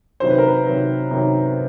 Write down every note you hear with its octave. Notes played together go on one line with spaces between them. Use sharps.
C3 D#3 F#3 C5
B4
A#4
B4
C3 D#3 F#3
C3 D#3 F#3